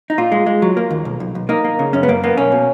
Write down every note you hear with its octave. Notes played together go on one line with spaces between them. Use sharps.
D#4
A#2 F4
G#3
G#3
F#3
A#3
D#2
B1
B1
B1
A#3 D#4
A#3
C#3
F#2 C#4
B3
F#2 A#3
A#3 B3
B1 C#4
B2